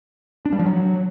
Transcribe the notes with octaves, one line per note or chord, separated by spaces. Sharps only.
D4
G3
F3
F#3